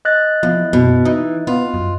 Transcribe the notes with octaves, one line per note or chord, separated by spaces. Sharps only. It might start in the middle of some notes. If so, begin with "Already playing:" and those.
D#5 F#6 A6
E2 F3
F#2 B2
E3 D#4
B3 F4
F#2